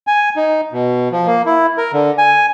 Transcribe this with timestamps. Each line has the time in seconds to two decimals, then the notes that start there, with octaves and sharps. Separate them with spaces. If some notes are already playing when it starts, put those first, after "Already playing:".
0.07 G#5
0.36 D#4
0.73 B2
1.12 F3
1.27 A#3
1.46 E4
1.78 A#4
1.93 D3
2.18 G#5